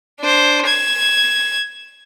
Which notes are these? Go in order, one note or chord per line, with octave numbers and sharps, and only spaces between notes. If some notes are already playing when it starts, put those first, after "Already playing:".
D4 C5
G#6 E7